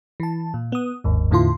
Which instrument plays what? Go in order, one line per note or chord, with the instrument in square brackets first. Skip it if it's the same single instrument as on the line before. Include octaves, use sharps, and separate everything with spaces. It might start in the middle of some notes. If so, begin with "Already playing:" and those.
[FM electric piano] E3 A5
A#2
B3 D#6
G1 D#2 G#2
E2 A2 D3 E4 F4 C6